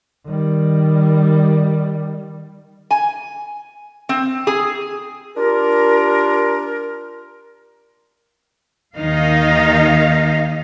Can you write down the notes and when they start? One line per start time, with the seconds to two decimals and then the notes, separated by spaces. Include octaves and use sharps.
0.26 D#3 G3
2.91 G#5
4.09 C4
4.47 G#4
5.36 D4 F4 G4 A#4
8.96 D#2 D#3 D#4 F5